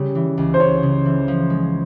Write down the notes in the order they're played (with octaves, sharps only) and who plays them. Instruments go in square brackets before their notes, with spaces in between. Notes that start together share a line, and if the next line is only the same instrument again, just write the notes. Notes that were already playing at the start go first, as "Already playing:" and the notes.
Already playing: [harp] C#3 G3
E3
C#2
[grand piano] C5
[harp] C#2 [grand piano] C#5
[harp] C#3
E3
F3
G#3